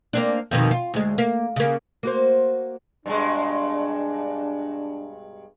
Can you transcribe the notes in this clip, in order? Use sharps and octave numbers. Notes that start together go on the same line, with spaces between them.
A#3 C4 D4
F2 B2 D#3
F4
D2 G#3
A#3
C#3 A#3
A#3 F#4 C5
G2 B2 G#3 D4